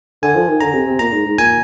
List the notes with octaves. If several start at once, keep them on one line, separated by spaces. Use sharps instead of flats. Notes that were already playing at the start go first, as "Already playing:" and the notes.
D3 G#5
F3
D#3
D3 A#5
C3
C3
A#2 A#5
G#2
G#2
A#2 G#5